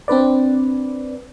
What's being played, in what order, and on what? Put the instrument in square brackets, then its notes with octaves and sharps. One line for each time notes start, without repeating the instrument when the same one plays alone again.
[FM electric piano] C4 D4 B4 D5